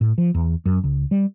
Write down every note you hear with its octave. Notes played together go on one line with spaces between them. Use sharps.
A2
F3
E2
F#2
C#2
G3